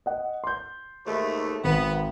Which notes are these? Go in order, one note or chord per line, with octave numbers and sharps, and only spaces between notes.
D#5 F#5
C6 G6
D#2 G#2 A3
G#1 B3